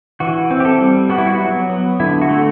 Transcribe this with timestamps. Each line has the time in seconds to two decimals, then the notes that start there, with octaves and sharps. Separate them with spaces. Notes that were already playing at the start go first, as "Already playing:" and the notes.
0.20 E3 F#4
0.51 C4
0.60 G4
0.65 A4
0.80 G3
1.09 B3 F#4
1.18 E4
1.27 F#4
1.40 F#3
1.70 B3
2.00 D3 E4
2.22 F#4
2.29 A3